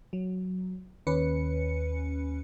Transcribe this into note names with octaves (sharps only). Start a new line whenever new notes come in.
F#3
D#2 C#4 B4 C#7